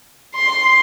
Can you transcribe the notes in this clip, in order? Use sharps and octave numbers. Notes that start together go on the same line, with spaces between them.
C6